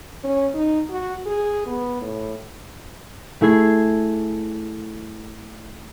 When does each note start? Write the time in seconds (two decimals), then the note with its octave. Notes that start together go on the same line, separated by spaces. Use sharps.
0.24 C#4
0.54 D#4
0.90 F#4
1.26 G#4
1.66 B3
2.01 A2
3.41 A3 E4 G#4 G#6 C7